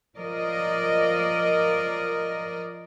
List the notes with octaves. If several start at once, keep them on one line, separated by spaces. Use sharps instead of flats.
F3 A#4 D5 D#5